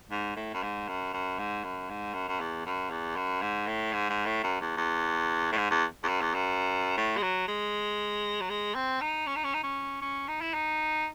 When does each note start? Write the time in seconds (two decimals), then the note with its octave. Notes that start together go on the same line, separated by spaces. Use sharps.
0.11 G#2
0.36 A2
0.54 F#2
0.63 G#2
0.88 F#2
1.14 F#2
1.39 G#2
1.64 F#2
1.90 G#2
2.14 F#2
2.28 F#2
2.40 E2
2.66 F#2
2.90 E2
3.16 F#2
3.42 G#2
3.67 A2
3.93 G#2
4.10 G#2
4.26 A2
4.44 F#2
4.61 E2
4.77 E2
5.52 A2
5.57 G#2
5.71 E2
6.04 E2
6.08 F#2
6.21 E2
6.34 F#2
6.97 A2
7.17 G#3
7.23 F#3
7.48 G#3
8.41 F#3
8.50 G#3
8.75 C4
9.01 D#4
9.27 C#4
9.36 D#4
9.44 C#4
9.54 D#4
9.64 C#4
10.02 C#4
10.28 D#4
10.41 E4
10.54 D#4